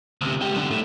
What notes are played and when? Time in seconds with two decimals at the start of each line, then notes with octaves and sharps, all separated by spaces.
0.21 D2 C3
0.41 G#3 G4
0.55 B1 D3
0.71 A2 A3